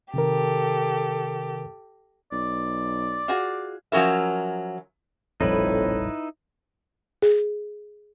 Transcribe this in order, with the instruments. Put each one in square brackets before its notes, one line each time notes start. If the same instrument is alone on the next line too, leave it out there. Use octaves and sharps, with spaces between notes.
[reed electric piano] C3 D#3 A#4 [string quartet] G4 A4
[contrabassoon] B1 [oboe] D5
[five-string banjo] F4 F#4 G#4
[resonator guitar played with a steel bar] F3 F#3 C#4 A#4 E5
[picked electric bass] F1 A#1 G3 [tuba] F2 [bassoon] A2 [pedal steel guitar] D#4 E4 B4
[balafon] G#4